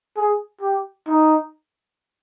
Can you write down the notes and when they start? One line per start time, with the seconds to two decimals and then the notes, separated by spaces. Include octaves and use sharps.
0.17 G#4
0.62 G4
1.08 D#4